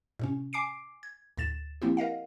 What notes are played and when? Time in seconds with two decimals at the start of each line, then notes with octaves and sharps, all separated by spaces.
0.19 A2 C3 C#4
0.53 G#5 D6 C7 D7
1.03 G#6
1.37 D2 A2 A6 E7
1.82 F3 A#3 C4 E4 G4
1.97 A#4 D#5 F5 F#5